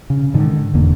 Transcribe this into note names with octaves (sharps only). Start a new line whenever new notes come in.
C#3
G#2 D3 D#3
F1 E2 D3 A#3